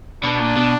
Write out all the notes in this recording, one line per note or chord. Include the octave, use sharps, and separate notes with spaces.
B2 D4
A#2
B2